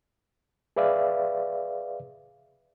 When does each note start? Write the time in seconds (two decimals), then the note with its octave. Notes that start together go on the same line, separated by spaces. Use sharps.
0.76 G#4 B4 D5 E5 F5